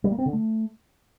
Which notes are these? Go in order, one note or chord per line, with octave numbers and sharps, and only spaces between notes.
G3
A#3
C4
D3
A3